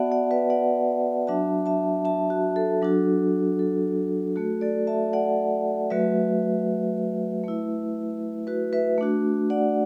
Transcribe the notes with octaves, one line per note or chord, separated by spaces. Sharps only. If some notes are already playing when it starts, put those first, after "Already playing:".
Already playing: B3 F#4 D5 E5 F#5 A5
D5 F#5
B4 E5
D5 F#5
F#3 D4 F#4 E5 A5
E5 A5
E5 A5
F#4
A4
F#3 D4 F#4
A4
A3 F#4 A4
A4 D5
E5 A5
D5 F#5
F#3 A3 F#4 B4 E5
A3 E4
F#4 B4
B4 E5
A3 D4 F#4
D5 F#5